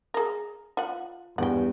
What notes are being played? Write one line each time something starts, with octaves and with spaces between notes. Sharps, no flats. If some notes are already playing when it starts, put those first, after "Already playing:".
G#4 A#4
F4 F#5
E2 G2 F#5 G5